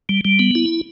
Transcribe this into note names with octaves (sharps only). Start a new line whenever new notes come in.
G3
G3
B3
E4